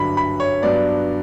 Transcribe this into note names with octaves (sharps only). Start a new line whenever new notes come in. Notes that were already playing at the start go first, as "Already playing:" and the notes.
Already playing: G2 D3 F#3 B5
B5
C#5
G2 F#3 B3 D4 D5